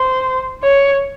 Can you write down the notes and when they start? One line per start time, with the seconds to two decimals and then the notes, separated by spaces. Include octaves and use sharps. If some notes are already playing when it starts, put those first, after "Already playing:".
Already playing: C5
0.63 C#5